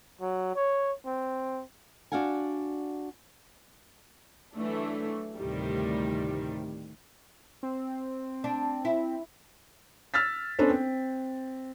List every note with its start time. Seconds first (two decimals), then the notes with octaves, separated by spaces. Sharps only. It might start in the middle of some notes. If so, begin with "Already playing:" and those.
0.21 F#3
0.55 C#5
1.06 C4
2.12 D4 F#4 F5 F#5 G#5
4.54 E3 F#3 A3 D4
5.37 D2 A2 C3 D#3 G3
7.63 C4
8.44 D4
8.85 E4
10.14 E6 F6 A6 B6
10.59 B3 C#4 D4 A4 B4 C5
10.70 C4